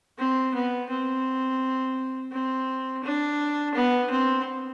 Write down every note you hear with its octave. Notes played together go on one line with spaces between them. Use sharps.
C4
B3
C4
C4
D4
B3
C4